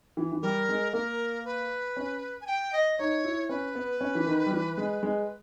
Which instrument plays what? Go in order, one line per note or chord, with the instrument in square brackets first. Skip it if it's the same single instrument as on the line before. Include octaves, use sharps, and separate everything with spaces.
[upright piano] E3
E3
[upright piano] G3 [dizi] A#4
[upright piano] G#3
[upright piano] A#3 [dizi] A#4
[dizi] B4
[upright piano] C#4
[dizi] G#5
G5
D#5
[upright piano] D#4 [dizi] C#5
[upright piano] E4
[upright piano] C#4 [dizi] B4
[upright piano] B3
C#4
E3
D#3
G3
E3
G#3
G#3